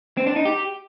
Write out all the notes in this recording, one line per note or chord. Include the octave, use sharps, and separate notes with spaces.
C4
D4
D#4
G4